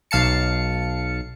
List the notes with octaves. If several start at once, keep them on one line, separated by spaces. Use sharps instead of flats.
B1 F5 A5 C#7